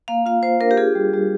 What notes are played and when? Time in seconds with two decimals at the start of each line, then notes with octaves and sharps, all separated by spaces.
0.08 A#3 F5
0.26 F4 F5
0.43 F4 C5
0.61 D4 A#4
0.71 G4
0.77 F4 G#4
0.95 G3
1.13 G3